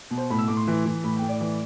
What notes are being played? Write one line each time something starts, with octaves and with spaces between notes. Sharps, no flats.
B2
C5
A2 B5
E6
A2 D6
C6
E3
E3
A2 B5
G5
A2
D5
E3